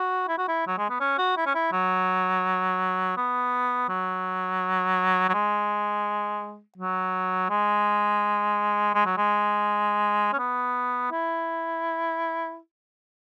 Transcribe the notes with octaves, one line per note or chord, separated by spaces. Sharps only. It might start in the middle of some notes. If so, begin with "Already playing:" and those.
Already playing: F#4
E4
F#4
E4
F#3
G#3
B3
C#4
F#4
E4
C#4
E4
F#3
B3
F#3
F#3
G#3
F#3
G#3
G#3
F#3
G#3
C#4
B3
E4